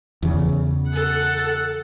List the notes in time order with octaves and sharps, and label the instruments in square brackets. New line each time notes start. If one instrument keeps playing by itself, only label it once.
[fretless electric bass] E2 C#3
[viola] A4 F#5